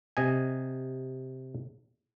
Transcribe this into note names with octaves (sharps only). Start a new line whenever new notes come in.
C3 D#5 G#5